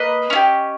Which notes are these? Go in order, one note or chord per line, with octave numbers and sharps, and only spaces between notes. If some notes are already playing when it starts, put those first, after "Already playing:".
Already playing: A#3 B4 D#5
C#4 E4
G4